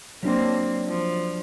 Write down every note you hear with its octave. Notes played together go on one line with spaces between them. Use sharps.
F#3 A#3 C4 D4
F3